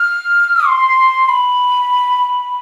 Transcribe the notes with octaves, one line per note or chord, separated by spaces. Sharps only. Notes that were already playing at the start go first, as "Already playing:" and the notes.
Already playing: F6
C6
B5